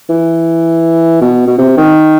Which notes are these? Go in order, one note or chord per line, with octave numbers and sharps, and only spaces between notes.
E3
B2
B2
C3
D#3